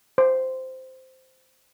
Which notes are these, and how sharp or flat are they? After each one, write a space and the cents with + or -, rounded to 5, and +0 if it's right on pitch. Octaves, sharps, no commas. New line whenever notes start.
C5 -10